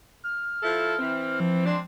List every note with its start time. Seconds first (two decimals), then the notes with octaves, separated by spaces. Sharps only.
0.24 F6
0.62 F3 E4 A4
0.99 E3 C4
1.40 F3
1.65 G#3 C4 D4